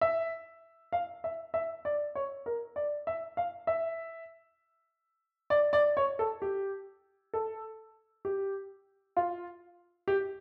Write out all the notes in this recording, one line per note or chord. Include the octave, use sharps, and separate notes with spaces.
E5
F5
E5
E5
D5
C#5
A#4
D5
E5
F5
E5
D5
D5
C#5
A4
G4
A4
G4
F4
G4